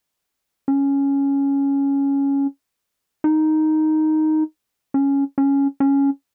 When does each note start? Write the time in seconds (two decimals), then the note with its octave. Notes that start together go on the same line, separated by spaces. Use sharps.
0.68 C#4
3.24 D#4
4.94 C#4
5.38 C#4
5.80 C#4